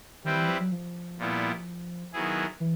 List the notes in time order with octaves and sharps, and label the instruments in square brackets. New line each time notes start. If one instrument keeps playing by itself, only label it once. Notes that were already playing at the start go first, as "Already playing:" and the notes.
[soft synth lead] D#3 [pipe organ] G3 C4 E4 G4 B4
[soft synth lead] E3
F3
F#3
F3
[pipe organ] A#2 G3 B3 E4
D#3 F#3 B3 E4 G#4
[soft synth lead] E3